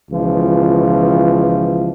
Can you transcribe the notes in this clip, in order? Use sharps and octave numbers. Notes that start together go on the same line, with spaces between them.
C#2 B2 E3 F3